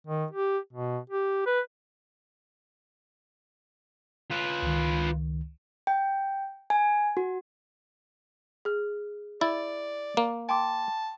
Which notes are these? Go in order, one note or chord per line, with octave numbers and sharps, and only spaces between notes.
D#3
G4
B2
G4
B4
F4 B4
C#2 D#3
G5
G#5
F#4
G#4 F6
E4 D5 A6
A#3
G5 A5 C6 D6